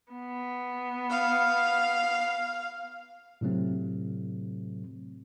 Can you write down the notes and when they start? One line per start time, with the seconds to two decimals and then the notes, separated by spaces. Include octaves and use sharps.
0.13 B3
1.10 F5
3.41 A2 C3 F#3 A3 C4